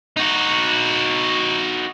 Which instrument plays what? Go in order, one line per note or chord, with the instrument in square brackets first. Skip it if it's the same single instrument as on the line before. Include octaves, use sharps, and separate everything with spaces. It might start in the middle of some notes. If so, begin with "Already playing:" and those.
[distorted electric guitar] D#4 F#4